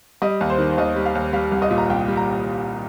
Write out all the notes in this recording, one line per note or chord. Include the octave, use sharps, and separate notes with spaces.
G3 D#5
D#2
C5
D#3
C5
D#2 D#5
G3
F5
D#2
G3 F5
C2
D#5
A#2
A#5
C2 G5
G3
A#5